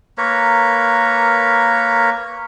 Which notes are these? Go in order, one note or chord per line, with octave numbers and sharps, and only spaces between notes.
A#3 A#4 B4 C#5